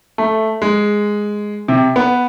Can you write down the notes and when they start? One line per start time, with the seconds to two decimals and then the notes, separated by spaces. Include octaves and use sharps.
0.18 A3
0.62 G#3
1.68 C3
1.96 B3